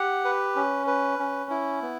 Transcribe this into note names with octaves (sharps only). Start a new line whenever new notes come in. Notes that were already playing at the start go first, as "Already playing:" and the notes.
Already playing: G4 F#5
B4
C#4
B4
C#4
E4
B3